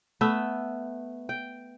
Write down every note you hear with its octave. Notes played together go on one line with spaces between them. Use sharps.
A3 B3 E5
G5